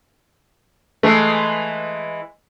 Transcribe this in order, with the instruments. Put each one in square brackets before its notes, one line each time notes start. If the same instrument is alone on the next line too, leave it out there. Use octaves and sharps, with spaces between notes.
[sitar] E3 G#3 [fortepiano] A3